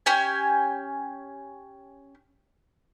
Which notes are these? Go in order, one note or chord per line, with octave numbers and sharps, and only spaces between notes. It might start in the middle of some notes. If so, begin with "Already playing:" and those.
C#4 G4 G#5